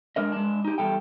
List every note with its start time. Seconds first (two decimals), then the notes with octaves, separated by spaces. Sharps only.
0.16 G#3 D4 A#4 D#5
0.32 G#3 D4
0.65 D#4 G4
0.78 E2 F3 G3 A4 G5